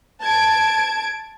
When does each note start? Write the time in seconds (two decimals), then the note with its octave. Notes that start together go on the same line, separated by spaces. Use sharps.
0.21 A5 G#6 D7